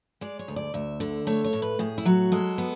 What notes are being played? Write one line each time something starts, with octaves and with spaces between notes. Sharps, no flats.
G#3 D5
C#5
D2
D5
D2 E5
D3
A3 C#5
C#5
A2
B4
A2 G#4
E4
F#3 F#4
G#3 A4
B3